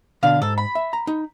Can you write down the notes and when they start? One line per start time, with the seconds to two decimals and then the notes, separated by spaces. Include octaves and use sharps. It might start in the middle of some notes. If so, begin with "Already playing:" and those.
0.23 B2 D3 D4 F5
0.42 G#2 A4
0.58 B5
0.75 E5
0.93 A#5
1.07 D#4